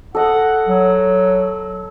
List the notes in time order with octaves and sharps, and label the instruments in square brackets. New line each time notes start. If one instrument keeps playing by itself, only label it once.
[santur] A4 D#5 [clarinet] F#5
[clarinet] F#3